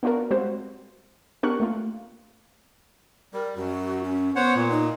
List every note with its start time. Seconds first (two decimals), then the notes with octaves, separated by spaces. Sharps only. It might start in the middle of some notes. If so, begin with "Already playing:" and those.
0.03 B3 D4 F4 F#4 A#4
0.31 G3 G#3 C4 F#4 C5
1.43 B3 D4 G4 A#4 C#6 F#6
1.60 A3 A#3 F4
3.33 G3 A#4
3.56 F#2 F#4
4.04 C#4
4.36 B3 C5 C#5 F#5
4.55 A#2
4.70 D#4